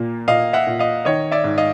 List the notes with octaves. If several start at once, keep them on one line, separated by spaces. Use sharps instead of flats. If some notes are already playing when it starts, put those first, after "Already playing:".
Already playing: A#2 A#3
A#2 D#5 F5
E5 F#5
A#2
D#5 F5
D#3 C#5 D#5
D5 E5
G#2
D#5 F5